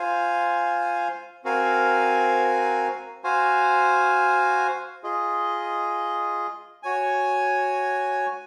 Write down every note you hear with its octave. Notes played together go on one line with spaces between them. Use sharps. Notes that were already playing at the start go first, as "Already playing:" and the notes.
Already playing: F4 C5 F5 G#5
C4 F#4 A#4 F5 G#5
F#4 C5 F5 G#5
F4 G#4 D#5
F#4 C#5 G#5